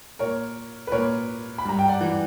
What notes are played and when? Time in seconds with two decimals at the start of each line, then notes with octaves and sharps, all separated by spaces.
0.19 A#2 A#4 C#5
0.87 B4
0.92 A#2 A#4 C#5
1.58 B5
1.65 G2 A#5
1.79 G5
1.88 D5 F#5
2.01 E3